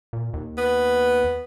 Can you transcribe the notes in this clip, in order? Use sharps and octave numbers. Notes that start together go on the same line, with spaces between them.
A#2
D#2
B3